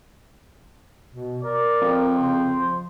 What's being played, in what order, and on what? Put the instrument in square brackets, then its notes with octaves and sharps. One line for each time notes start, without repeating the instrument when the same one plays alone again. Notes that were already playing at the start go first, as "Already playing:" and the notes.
[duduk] B2
[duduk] A#4 [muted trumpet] D5
[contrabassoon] F2
[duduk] C#3 [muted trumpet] C5
[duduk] F3